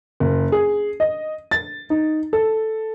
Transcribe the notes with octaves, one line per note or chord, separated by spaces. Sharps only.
F#1
G#4
D#5
A6
D#4
A4